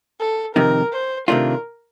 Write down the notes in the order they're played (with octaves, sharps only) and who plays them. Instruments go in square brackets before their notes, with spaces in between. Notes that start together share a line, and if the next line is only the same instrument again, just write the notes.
[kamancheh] A4
[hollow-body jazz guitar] F2 C3 D#3 [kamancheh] A#4
[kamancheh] C5
[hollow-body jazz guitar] C3 D#3 A3 D4 F4 [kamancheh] A#4